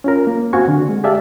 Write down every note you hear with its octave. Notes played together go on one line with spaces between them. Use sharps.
C#4 F4 A#4
A#3
C4 F#4 F5 F#5 G#5 C#6
D3
G#3
G4 G#4 D5 E5 F5 A5